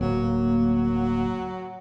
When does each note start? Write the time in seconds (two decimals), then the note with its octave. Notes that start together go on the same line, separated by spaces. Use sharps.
0.01 D1 F#3 A#3